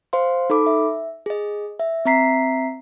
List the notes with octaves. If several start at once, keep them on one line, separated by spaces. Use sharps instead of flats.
C5 F5 C6
D#4 A4 B5 D6
E5
G#4 D#5
E5
C4 E5 A#5 B6 C7